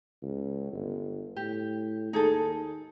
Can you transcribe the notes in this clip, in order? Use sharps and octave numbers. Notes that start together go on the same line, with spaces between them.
C#2
G1
A2 G4
D#2 D#4 G#4 A4